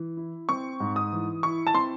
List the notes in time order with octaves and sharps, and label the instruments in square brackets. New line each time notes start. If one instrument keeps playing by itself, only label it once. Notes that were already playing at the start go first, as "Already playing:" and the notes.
Already playing: [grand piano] E3
E4
[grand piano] C4 [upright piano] C#6
[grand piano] G#2
[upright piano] D#6
[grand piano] E3
[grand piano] E4 [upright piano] C#6
[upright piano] A5
[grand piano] C4 [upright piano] C6